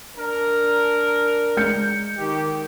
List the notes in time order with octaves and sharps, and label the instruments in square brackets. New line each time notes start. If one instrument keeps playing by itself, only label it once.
[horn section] D4 A#4
[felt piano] G#3 G6 C#7
[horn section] D#3 G4